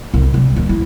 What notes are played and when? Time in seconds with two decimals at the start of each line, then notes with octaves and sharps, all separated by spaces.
0.14 C2
0.34 G3
0.56 D#2
0.69 E4